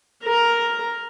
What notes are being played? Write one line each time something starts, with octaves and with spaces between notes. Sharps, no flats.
A#4